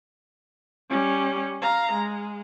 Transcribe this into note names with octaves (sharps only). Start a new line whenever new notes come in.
G3 C#4
F5 A#5
G#3